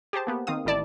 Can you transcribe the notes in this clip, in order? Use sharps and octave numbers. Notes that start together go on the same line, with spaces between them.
G4 G#4 C5 A5
A#3 B3 G4
D#3 C4 F5 D#6
A1 D#3 E4 D5 A5